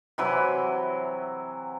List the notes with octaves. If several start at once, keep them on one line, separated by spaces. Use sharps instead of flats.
C3 E3 F#3